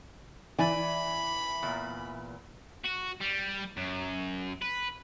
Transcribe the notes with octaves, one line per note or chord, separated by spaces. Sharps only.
E3 D5 G#5 B5
E2 A#2
F#4
G3
F#2
B4